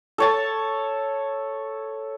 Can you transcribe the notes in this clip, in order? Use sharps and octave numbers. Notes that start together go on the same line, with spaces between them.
A4 C#5 A5